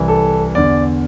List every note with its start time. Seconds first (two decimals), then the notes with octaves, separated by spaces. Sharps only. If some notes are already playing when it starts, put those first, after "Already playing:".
Already playing: C2 C3 E3
0.08 A4
0.55 E2 D3 D5